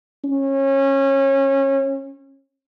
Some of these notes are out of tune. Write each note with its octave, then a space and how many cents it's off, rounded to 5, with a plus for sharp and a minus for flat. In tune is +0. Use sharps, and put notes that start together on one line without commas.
C#4 -25